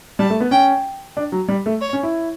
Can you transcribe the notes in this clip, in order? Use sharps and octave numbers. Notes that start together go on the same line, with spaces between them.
G3 A5
A3
B3
C#4 G5
D4
F#3
G3
A3
C#5
C#4
E4